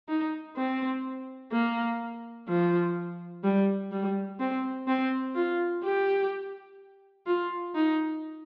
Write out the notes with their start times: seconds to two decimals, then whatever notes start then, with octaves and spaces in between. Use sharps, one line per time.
0.08 D#4
0.57 C4
1.52 A#3
2.49 F3
3.44 G3
3.92 G3
4.40 C4
4.87 C4
5.35 F4
5.83 G4
7.26 F4
7.75 D#4